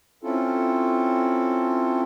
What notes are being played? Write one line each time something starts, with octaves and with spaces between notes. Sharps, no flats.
C4 C#4 E4 F4 A4